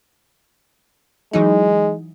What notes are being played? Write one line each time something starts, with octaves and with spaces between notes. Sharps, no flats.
E3 F#3 G#3 D#4